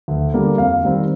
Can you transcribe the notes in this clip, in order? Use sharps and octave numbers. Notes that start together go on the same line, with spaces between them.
D2
D3 G3 A#3
F2 F5
D#3 G3 C4